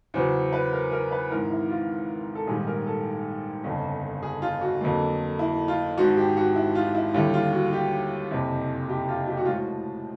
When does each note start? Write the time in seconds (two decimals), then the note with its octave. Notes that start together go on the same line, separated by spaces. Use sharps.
0.14 E2 C#3 F#3 B3 C5
0.53 B4
0.73 A#4
0.92 A#4
1.11 B4
1.30 G#1 G#2 E3 A#4
1.50 E4
1.70 F4
2.35 A4
2.47 A#1 G#2 D#3 G3 G#4
2.67 A#4
2.86 A4
3.64 G1 F2 C#3
4.23 G#4
4.42 F4
4.61 F#4
4.81 F2 D3 F#3 A#3
5.39 E4
5.68 F4
5.98 G#1 G#2 F3 F#4
6.17 G4
6.37 F#4
6.56 E4
6.75 F4
6.95 E4
7.14 D#2 D3 G3 E4
7.34 F4
7.53 F#4
7.73 G4
8.31 F#1 F2 C3
8.89 G4
9.09 F4
9.28 G4
9.37 F#4
9.45 A2 F3 G#3 F4
9.54 F#4